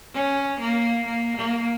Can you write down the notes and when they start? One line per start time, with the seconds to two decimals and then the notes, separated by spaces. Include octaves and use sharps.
0.14 C#4
0.60 A#3
1.06 A#3
1.37 A#3